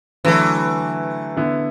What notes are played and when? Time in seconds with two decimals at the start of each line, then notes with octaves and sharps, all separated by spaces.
0.25 D3 E3 F#3 A3
1.36 D3 B3 E4